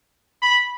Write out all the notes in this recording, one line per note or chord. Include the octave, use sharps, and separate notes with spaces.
B5